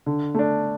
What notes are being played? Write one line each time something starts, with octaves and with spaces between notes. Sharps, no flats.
D3
A3 D4